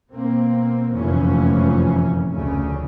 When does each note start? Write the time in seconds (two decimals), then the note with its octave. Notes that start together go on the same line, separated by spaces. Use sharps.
0.11 B2 A#3 C4
0.92 F1 F#2 A#2 E3 F3 C#4
2.32 F1 D2 C#3 C#4